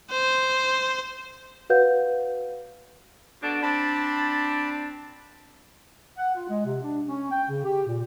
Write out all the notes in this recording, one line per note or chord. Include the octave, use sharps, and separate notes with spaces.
C5
F#4 B4 C#5 F5 F#5 G6
B2 D3 D4
C4 D4 A5 B5
F#5
F4
G#3
C3
D4
C#4
G5
C#3
G4
A#2